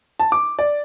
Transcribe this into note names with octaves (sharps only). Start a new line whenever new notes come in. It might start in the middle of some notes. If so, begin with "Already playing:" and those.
A5
D6
D5